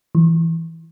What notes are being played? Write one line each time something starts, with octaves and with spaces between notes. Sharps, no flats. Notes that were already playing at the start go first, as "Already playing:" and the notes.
E3